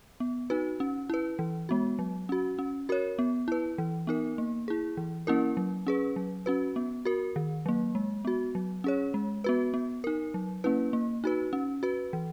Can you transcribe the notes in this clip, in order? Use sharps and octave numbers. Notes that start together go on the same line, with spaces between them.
B3
D#4 F#4 B4
C#4
E4 B4
E3
G#3 B3 F#4
F#3
C#4 F#4
C#4
F#4 A#4 C#5
B3
E4 B4
E3
B3 D#4 A#4
A#3
E4 G#4
E3
A#3 C#4 E4 A#4
F#3
C#4 G#4 B4
F#3
C#4 F#4 B4
B3
F#4 A#4
D#3
F#3 A#3
G#3
B3 F#4
F#3
C#4 G#4 C#5
G#3
B3 F#4 B4
B3
D#4 A#4
F#3
A#3 C#4 E4 B4
A#3
D#4 F#4 B4
C#4
F#4 B4
E3